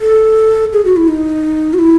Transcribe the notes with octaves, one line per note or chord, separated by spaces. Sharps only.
A4
G#4
F#4
E4
D#4
F#4
E4